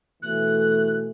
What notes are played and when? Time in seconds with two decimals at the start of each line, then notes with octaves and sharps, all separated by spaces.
0.22 B2 E3 A3 F#6